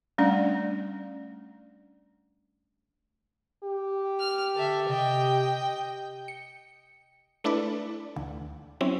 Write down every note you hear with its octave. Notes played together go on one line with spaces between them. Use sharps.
G3 A3 C#4 D4 D5
G4
F6
D3 A4 E5
C3 D#5 G5
C#7
A3 D4 E4 A4 B4 D5
D2
F#3 C4 C#4 E4